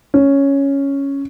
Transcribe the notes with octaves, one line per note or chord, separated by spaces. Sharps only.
C#4